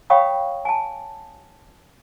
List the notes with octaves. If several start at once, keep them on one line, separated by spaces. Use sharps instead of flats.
C#5 F5 G5 B5 C#6 D#6
G#5 A5